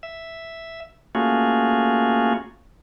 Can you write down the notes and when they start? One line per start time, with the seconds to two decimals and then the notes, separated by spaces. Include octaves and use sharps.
0.03 E5
1.15 A3 A#3 C#4 F4 F#4 G#4